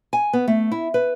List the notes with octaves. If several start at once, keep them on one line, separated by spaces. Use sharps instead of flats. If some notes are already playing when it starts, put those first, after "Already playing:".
G#5
B3
A3
E4
B4